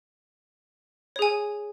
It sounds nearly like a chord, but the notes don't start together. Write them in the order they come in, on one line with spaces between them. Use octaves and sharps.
C#5 G#4 G#5